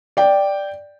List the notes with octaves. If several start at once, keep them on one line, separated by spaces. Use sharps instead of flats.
D5 G5